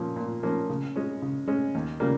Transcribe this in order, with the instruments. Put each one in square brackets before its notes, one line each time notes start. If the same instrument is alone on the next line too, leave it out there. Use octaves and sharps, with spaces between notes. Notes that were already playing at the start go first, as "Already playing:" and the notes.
Already playing: [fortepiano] A#2 F3 A#3 C#4
A#2
F3 A#3 C#4
C#3
G#3 C#4
C#3
G#3 C#4
D#2
C#3 G3 A#3